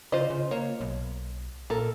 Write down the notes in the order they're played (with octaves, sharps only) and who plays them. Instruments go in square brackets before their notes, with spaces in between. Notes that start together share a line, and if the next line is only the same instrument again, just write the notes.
[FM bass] C#3 [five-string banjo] F4 C5 D#5
[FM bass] C#3
[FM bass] A#3 [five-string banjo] C#5
[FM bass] B1
[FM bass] A#2 [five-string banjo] A4 A#4